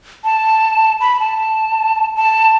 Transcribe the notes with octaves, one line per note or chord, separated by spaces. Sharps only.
A5
B5
A5
A5